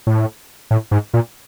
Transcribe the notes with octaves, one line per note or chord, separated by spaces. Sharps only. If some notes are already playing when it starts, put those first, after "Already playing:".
A2
A2
G#2
A#2